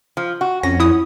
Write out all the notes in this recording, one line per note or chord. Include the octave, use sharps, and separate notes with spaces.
F3
F#4
F2 C#4 A#6
E4 D#6